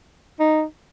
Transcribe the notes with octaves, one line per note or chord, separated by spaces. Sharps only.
D#4